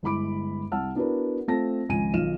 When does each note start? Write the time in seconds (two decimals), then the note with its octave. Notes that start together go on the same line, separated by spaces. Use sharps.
0.03 G1 G#3 E4 B5 D6 D7
0.72 C2 F#5 A5 E6 F6
0.95 B3 D4 E4 F#4 A#4 B4
1.48 A3 C4 F4 A5 A#6
1.89 G#1 C#2 F3 G#5 D#7
2.14 B1 D#3 F4 F6 E7